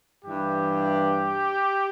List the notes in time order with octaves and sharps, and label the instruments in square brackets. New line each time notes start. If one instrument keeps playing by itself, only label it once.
[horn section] G2 E3 G4